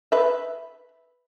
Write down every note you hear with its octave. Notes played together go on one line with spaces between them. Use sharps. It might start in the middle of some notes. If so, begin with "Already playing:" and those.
B4 E5